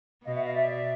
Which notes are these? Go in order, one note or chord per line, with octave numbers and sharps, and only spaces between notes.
B2 D#5 F5
E5 F#5
D#5 F5
D5 E5